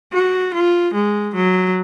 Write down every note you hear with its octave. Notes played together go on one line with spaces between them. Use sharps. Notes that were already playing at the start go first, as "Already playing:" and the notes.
F#4
F4
G#3
F#3